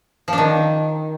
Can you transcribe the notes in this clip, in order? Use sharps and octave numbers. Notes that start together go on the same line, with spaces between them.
F3
D4
D#3